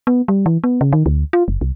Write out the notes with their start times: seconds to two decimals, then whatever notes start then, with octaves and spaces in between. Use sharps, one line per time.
0.07 B3
0.28 G3
0.46 E3
0.64 B3
0.81 C#3
0.93 D#3
1.06 D2
1.33 F4
1.48 F#1
1.61 C2